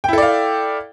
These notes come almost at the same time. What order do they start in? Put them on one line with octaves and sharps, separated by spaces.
G5 E4 A4 D5 F5